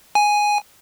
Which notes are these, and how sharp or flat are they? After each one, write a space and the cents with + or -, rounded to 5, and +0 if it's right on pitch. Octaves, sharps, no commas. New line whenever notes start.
G#5 +0